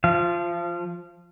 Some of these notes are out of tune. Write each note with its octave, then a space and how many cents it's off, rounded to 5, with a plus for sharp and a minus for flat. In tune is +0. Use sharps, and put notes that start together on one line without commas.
F3 +0 F5 -30